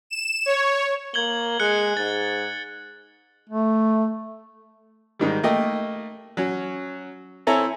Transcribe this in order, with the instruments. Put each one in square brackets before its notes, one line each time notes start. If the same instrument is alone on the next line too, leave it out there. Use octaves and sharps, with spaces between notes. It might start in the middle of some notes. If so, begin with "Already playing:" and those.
[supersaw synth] E7
C#5
[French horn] A#3 [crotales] G#6 F#7 G7
[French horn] G#3 [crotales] F#6 C#7
[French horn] G#2 [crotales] A6
[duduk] A3
[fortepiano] G#2 D#3 G3
A3 A#3 D#5 G5
F#3 C#4
C4 E4 A4 C#5 G#5 A#5